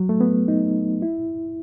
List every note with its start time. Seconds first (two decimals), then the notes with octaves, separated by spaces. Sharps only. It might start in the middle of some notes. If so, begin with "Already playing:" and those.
Already playing: F#3
0.09 A3
0.21 B3
0.48 D#4
1.02 E4